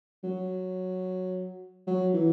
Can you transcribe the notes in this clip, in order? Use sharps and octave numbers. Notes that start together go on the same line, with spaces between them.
F#3
F#3
E3